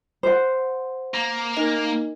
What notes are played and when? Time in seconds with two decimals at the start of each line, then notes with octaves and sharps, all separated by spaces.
0.23 C5 F#5
1.14 A#3
1.57 D#4 A#4 D#5